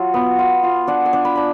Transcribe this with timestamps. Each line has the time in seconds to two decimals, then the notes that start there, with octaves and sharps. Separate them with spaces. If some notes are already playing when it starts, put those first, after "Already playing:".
Already playing: F#3 F4
0.14 B3
0.39 F4
0.63 F4
0.87 D4 F#5
1.06 G#5
1.13 D4
1.25 B5
1.36 D4 B5